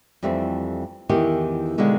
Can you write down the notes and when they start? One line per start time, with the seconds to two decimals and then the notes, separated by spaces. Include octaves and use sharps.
0.23 F2 E3 G3 A3 C4
1.09 E2 D#3 E3 G4
1.78 B2 D3 D#3 G#3 A#3